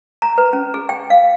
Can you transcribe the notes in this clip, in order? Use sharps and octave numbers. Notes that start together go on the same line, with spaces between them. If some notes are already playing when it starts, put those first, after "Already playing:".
A#5
B4
C#4
G#4
G5
F5